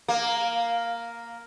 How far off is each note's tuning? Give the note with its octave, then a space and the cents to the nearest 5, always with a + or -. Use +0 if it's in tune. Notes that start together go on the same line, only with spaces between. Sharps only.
A#3 +0